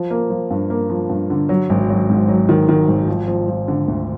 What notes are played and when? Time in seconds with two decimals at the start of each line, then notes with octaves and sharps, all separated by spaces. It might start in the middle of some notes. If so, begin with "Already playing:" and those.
Already playing: F3
0.11 A#3
0.30 F3
0.51 G2
0.70 A#3
0.90 F3
1.09 G2
1.30 D3
1.49 F#3
1.70 G#1
1.89 F#3
2.10 G#2
2.28 F#3
2.49 D#3
2.69 D#3
2.88 G#1
3.08 F3
3.28 F3
3.48 F3
3.68 D3
3.88 D2